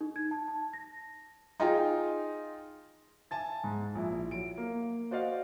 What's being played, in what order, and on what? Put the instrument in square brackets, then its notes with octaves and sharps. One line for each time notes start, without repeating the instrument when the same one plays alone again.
[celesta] D#4
G#6
A5
A5
A#6
[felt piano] D#4 F4 G#4 G5
[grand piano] E5 G#5 A5 A6
G#2
A#1 E4
F#3 D7
A#3
F#4 C5 D5 D#5 F5